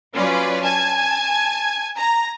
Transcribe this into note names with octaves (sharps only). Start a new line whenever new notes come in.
F#3 C#4 F4 B4 D5
G#5 A5 G#6
A#5